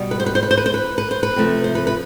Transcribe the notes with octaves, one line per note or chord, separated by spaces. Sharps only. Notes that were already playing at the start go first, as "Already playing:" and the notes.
Already playing: B2 G3 B3
B4
C5
B4
C5
B4
C5
B4
C5
B4
B4
C5
B4
C3 F3 A3 C4
C5
B4
B4